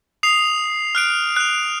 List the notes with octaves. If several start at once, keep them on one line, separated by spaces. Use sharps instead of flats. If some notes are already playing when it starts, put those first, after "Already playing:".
D#6 C7 F7
F6 F#6 D7
F#6 F7